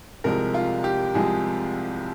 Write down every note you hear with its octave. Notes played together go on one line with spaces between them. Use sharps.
C2 C3 F3 G#3 A#4
F4
G4
C2 C3 F3 G#3 G#4